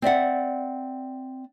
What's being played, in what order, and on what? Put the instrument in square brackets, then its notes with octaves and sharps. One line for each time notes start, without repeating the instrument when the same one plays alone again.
[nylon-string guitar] C4 D5 E5 F#5